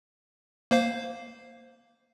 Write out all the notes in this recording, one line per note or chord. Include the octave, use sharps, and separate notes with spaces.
A#3 C5 F5